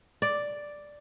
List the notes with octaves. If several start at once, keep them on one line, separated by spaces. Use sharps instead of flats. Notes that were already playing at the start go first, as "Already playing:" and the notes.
D5